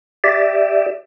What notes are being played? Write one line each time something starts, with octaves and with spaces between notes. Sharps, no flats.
G4 D5 E5